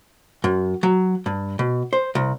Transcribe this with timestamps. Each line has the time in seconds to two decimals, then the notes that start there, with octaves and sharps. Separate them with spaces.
0.44 F#2
0.83 F#3
1.26 G2
1.59 B2
1.93 C5
2.15 C2